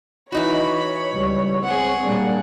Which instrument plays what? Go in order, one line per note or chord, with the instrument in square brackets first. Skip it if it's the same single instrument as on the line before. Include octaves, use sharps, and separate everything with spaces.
[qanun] E3 D#4 F#4 [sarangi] C#5 [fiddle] B5
[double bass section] C#2 G3
[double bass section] C4 [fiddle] G#4 F#5
[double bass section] A#2 G3 A#3 [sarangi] D4